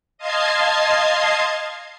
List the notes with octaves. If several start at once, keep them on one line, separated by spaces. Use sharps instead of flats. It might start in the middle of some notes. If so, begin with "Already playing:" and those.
D#5 F5 A5 C6 G#6 C7